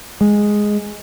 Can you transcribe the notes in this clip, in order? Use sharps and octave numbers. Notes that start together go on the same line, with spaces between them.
G#3